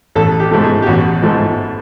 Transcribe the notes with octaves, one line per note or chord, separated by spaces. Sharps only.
A1 A4
G4
G#2 F3 A3
G#4
G4
A1 F#4
G#2 F3 A3